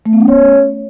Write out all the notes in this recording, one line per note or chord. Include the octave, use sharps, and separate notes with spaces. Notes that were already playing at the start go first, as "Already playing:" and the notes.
A3
B3
C#4
C#5